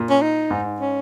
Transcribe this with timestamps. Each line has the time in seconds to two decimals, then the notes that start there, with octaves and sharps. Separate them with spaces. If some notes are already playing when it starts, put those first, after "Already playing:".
Already playing: A#2
0.10 C#4
0.22 D#4
0.51 G#2
0.80 C#4